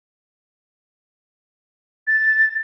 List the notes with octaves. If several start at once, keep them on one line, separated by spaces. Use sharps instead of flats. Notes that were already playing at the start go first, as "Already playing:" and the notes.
A6